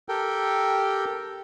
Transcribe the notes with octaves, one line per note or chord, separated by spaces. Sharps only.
G4 A4 A#4 G5